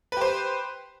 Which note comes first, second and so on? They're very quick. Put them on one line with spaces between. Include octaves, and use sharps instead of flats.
B4 G4 C5